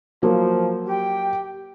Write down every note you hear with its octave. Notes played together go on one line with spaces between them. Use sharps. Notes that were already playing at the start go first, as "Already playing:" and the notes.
F3 F#3 A#3
G4 G5